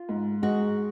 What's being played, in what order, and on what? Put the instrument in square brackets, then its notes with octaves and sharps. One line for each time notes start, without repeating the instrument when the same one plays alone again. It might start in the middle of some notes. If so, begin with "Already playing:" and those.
Already playing: [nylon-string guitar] F4
[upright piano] G#2
[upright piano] G#3 [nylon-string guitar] F#4